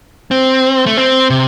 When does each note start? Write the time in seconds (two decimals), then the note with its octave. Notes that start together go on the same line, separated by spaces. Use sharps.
0.31 C4
0.86 A3
0.97 C4
1.30 C3